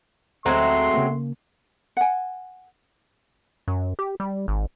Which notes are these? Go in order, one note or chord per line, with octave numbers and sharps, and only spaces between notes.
D2 F#3 G#3 A3 C4 E5 A#5 C6
C#3 A#3
F#5 G#5
F#2
G4
G3
G#1